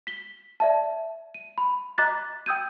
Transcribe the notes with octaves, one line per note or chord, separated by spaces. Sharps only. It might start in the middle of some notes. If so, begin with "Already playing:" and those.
B6 G7
D5 E5 A5
D#7
B5
D#5 A#5 D6 F#6 A6 B6
G5 D#6 E6 G6 G#6 D#7